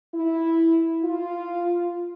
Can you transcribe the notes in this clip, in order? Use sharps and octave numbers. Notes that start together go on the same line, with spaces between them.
E4
F4